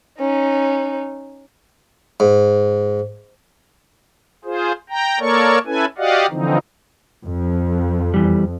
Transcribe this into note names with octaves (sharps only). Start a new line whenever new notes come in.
C#4 D#4
G#2
F4 G#4 C5
G5 A#5
A#3 A4 A#4 C#5 D5 C#6
C#4 E4 A4 B4 G#5
F#4 G4 D5 D#5 F5 F#5
D3 E3 F3 C4 D#4
F2
E2 E3 G3